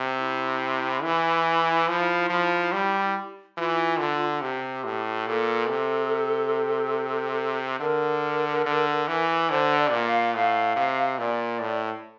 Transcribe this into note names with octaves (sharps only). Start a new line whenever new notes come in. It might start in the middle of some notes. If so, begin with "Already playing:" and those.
Already playing: C3
E4
E3
F3
F3
G3
E3 F4
D3
C3 G4
A2
A#2 A4
C3
D3 A#4
D3
E3
D3 C5
D5
A#2
F5
A2 F5
C3
A#2 D5
A2